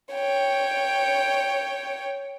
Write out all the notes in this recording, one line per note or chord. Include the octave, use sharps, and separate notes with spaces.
C#5 G5